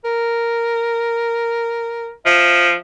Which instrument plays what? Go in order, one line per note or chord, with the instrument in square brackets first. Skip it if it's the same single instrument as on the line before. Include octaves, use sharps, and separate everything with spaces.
[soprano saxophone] A#4
[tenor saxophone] F3 [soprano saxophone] E5